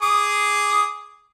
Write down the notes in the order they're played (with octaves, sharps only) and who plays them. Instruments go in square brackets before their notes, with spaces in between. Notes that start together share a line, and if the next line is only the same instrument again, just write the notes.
[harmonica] G#4 D6 D#6